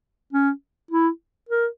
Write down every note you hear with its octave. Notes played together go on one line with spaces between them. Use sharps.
C#4
E4
A#4